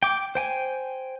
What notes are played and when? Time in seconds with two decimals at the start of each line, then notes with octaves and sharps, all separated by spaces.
0.03 G5 D6
0.35 C5 G5 G#5